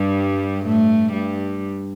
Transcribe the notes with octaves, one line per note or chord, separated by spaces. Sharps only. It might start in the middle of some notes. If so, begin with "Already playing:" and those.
Already playing: G2 G3
A2 A3
G2 G3